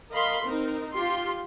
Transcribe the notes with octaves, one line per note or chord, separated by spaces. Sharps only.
A#4 D#5 F5 B5 C6
C4 D#4 A#4
F4 G4 C6